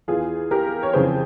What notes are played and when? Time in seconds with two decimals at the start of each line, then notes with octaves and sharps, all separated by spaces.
0.08 E2 E3 F4 G#4
0.51 G4 A#4
0.83 C#5
0.93 F2 C#3 E3 G#4 C5